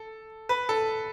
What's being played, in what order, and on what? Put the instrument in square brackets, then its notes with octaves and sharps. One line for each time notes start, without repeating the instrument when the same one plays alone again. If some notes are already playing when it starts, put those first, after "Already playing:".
Already playing: [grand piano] A4
B4
A4